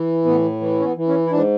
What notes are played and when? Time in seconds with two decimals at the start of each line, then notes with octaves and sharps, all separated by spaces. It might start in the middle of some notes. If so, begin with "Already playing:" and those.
Already playing: E3
0.25 A2 B3
0.61 E3
0.79 C#4
0.85 B3
0.97 E3
1.08 C#4
1.26 E4
1.31 G#2 D4